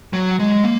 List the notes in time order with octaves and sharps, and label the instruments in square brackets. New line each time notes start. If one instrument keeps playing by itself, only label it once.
[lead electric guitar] F#3
G#3
A#3